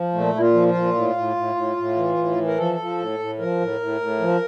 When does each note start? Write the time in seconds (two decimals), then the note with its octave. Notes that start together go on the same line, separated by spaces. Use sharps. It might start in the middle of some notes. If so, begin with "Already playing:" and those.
Already playing: F3
0.14 A#2 A3
0.34 A#2 E4
0.40 F4
0.54 F3
0.68 F4
0.74 A#2
0.94 A2
1.16 A2
1.36 A2
1.55 A2
1.77 A2
1.96 E3
2.17 A2
2.37 E3
2.47 A#4
2.57 F3 A4
2.79 F3
2.98 A2
3.19 A2
3.39 F3 A#4
3.60 A2
3.80 A2
4.01 A2
4.20 F3